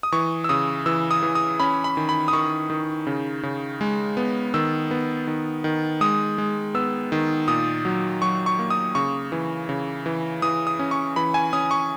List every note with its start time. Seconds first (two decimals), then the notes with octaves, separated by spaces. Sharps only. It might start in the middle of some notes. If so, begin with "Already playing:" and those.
0.03 D#6
0.12 E3 C#6
0.44 E6
0.49 C#3 D#6
0.86 E3 E6
1.11 D#6
1.23 E3
1.35 D#6
1.60 C#4 B5
1.84 B5
1.97 D#3
2.09 B5
2.28 D#6
2.33 D#3 C#6
2.70 D#3
3.07 C#3
3.43 C#3
3.81 G#3
4.17 B3
4.54 D#3 E6
4.91 B3
5.27 D#3
5.64 D#3
6.01 G#3 D#6
6.38 G#3
6.74 B3 E6
7.12 D#3
7.48 A#2 D#6
7.85 F#3
8.22 F#3 C#6
8.46 C#6
8.59 A#3
8.70 D#6
8.95 C#3 C#6
9.32 E3
9.69 C#3
10.06 E3
10.42 E3 D#6
10.67 D#6
10.79 C#4
10.91 C#6
11.16 E3 B5
11.34 G#5
11.53 C#4 D#6
11.71 C#6